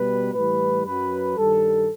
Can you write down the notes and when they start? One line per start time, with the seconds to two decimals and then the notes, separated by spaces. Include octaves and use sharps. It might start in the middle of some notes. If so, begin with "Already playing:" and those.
Already playing: B2 G3 B4
0.32 A2 E3 G3 B4
0.84 F#2 F#3 B4
1.37 G2 D#3 G3 A4